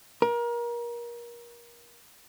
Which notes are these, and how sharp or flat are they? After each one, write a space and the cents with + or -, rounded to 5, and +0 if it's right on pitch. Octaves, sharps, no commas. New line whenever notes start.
A#4 +30